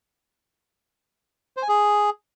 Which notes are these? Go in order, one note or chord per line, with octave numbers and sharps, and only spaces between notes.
C5
G#5
G#4